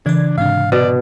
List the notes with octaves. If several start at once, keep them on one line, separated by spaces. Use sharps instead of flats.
C#3 E3 D4 D5 G#6
G#2 C3 D4 F5
B2 D5